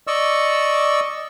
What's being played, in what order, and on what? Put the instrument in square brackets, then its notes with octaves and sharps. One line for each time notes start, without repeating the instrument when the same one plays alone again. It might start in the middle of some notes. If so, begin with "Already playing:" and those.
[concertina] D5 D#5 C#6 E6